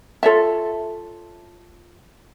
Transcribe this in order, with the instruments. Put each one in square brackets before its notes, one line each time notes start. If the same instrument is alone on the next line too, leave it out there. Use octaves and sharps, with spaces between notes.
[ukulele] F4 A4 C#5 E5